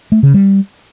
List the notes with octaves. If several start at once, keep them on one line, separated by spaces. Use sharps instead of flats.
A3
C#3
G3